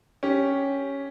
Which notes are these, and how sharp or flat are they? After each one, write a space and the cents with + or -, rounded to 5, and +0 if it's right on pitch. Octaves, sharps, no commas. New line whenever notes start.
C#4 +0 G4 +0